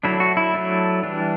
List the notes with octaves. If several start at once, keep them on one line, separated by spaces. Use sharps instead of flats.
F#3 A3 D4 E4
F#4
E4
F#3 A3 D4
E3 G3 D4